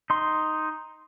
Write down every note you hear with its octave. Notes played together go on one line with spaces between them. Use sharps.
D#4 C6